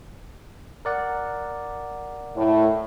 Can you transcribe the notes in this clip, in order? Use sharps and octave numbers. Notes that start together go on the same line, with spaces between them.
A#4 D5 F#5
A2